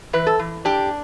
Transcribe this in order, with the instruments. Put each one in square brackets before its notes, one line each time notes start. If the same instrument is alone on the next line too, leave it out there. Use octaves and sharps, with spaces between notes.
[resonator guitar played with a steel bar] E3 B4
A4
E3
D4 G4